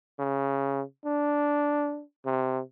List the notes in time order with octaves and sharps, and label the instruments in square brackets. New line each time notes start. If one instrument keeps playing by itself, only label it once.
[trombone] C#3
D4
C3